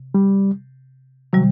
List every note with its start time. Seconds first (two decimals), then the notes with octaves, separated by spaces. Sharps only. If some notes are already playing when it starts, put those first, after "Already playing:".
Already playing: C3
0.14 G3
1.33 C3 D#3 F#3 G3